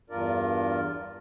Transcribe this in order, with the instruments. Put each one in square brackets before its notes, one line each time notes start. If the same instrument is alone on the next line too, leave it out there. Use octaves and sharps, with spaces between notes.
[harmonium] E2 G2 D4 F4 A#4 D5